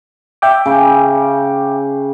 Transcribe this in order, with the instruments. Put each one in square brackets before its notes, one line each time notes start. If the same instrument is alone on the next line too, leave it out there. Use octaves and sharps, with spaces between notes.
[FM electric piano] E5 G5 D6
[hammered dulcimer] C#3